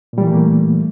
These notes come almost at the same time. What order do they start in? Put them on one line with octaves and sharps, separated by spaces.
A#2 G3 E3 A3 A#3